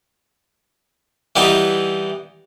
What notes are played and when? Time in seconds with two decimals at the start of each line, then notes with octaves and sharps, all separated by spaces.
1.36 E3 G3 B3 D#4 E4